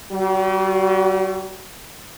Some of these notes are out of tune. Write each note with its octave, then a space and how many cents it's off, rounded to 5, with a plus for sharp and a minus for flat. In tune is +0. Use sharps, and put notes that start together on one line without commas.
G3 -40 F#4 +0